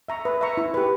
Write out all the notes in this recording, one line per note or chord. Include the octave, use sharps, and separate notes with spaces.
E5 A#5 C#6
B4
E5 A#5 C#6
E4
G4 B4